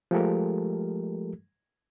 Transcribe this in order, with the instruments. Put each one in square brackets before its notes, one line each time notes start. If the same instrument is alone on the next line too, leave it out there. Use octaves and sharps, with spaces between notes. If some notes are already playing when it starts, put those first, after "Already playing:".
[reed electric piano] F3 G#3 A3 G4 A4 A#4